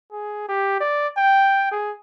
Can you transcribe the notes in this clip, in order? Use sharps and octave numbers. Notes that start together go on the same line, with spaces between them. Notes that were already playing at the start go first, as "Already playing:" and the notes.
G#4
G4
D5
G5
G#4